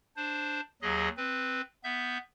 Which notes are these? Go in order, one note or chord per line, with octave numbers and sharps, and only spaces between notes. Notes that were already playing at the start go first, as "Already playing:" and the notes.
D4 C5
D#2 F#3 G#4 D#5
C4 B4
B3 E5 G6